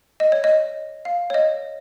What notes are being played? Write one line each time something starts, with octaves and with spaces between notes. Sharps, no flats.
D#5
C#5
D#5
F5
C#5
D#5